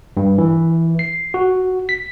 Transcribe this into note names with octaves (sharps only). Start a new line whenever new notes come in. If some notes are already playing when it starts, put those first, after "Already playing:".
G2
E3
C7
F#4
B6